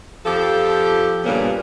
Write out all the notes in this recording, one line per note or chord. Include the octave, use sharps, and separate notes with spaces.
F2 F3 G4 A4
G2 A#2 C#3 A#3 B3